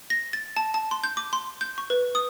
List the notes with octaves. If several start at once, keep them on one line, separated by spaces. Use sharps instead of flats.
A#6
A6
A5
A5
C6
G6
D6
C6
G6
C#6
B4
D#6